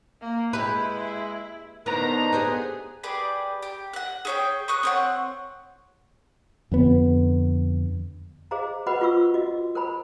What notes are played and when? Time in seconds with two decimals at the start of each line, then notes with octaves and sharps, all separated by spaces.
0.21 A#3
0.53 G#3 E4 G4 B4
1.86 A2 D3 B3 D#4 A#4 C5 A#5
2.33 B3 G4 G#4 C5
3.03 G4 G#4 B4 D5
3.63 G4
3.93 F#5 F#6
4.25 G#4 C#5 G5
4.68 C#6 D#6 F#6
4.83 C4 C#5 F#5
6.72 F2 D3 B3
8.51 G#4 C5 D#5 F5 A#5
8.86 F#4 B4 C5 D#5 F#5 B5
9.01 F4 F#4 C#6 E6
9.34 F#4 D#5
9.75 A#4 C5 G#5 A#5 B5